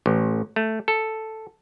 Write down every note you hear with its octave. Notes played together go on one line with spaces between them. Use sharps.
A1
A3
A4